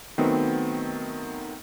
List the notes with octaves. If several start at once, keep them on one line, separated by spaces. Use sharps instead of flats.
D#3 F#3 A3 B3 C4